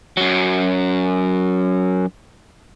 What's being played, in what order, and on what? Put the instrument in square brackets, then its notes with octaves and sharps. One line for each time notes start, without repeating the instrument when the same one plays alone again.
[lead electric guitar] F#2 F#3